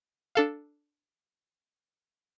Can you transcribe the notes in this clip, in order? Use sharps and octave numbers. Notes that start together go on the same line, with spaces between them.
D4 A4 F5